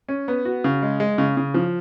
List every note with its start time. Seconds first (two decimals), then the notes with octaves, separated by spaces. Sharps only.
0.09 C#4
0.28 B3
0.45 F#4
0.64 C#3
0.83 G#3
1.00 G#3
1.18 C#3
1.37 C#3
1.54 F3